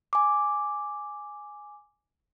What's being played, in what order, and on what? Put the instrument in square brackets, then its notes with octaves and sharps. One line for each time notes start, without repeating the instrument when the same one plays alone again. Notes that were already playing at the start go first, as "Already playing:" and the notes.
[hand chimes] G#5 D6